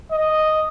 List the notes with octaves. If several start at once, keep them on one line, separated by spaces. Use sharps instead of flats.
D#5